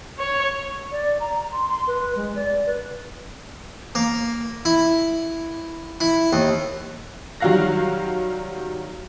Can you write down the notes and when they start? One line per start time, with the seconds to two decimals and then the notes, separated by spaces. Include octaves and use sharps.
0.19 C#5
0.92 D5
1.20 A#5
1.53 C6
1.68 C6
1.87 B4
2.16 G#3
2.36 D5
2.66 B4
3.95 A#3
4.65 E4
6.01 E4
6.33 D#2
7.40 D#3 F#3 G3 F5 F#6 A#6